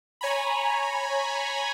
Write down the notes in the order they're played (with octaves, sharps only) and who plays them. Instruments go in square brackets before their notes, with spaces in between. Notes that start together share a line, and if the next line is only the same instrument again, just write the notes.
[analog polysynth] C#5 G#5 A#5 B5